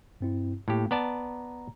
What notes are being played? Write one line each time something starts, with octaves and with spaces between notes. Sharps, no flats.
G2 C4 E4
A2 A3 A#3 G4
B3 D5 A5 A#5